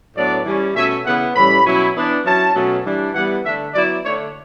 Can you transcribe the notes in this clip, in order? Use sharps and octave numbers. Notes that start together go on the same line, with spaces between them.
A2 F#3 B3 D4 D5
E3 G3 C#4
B2 A3 C#4 E5
C#3 E3 B3 E4 F#5
A2 E3 G3 C#4 B5
B2 F#3 C#4 E4
E3 B3 D4
F#3 C#4 E4 A5
B2 F#3 A3 C#4
E3 G3 D4
E3 G3 B3 F#5
D3 A3 D4 E5
F#3 B3 E4 D5
D3 A3 D4 C#5